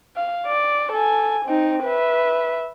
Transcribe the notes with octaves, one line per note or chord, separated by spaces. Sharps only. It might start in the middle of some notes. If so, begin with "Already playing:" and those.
F5
D5
A4 G#5
C4 D#4
B4 E5